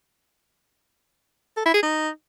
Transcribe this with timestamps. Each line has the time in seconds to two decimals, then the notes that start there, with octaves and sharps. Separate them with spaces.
1.57 A4
1.65 E4
1.74 G#4
1.82 D#4